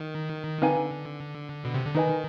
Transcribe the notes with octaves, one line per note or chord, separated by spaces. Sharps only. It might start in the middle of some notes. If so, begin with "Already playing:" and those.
Already playing: D#3
D3 C4 D#4 B4 F5 G#5
B2
C3
D3
D#3 D#4 B4 D#5 G#5